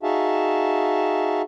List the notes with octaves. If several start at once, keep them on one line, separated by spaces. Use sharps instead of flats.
D#4 F#4 G#4 E5 F5 A5